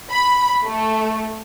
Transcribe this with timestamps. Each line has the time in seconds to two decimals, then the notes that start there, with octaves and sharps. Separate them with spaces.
0.12 B5
0.65 A3